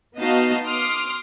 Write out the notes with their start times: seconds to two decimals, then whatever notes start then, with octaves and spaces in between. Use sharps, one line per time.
0.18 B3 D#4 F#4 D#5 F5 A5
0.66 C6 D6 D#6 F6 C7